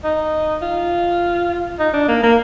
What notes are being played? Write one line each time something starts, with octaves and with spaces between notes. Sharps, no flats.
D#4
F4
D#4
D4
A#3
A#3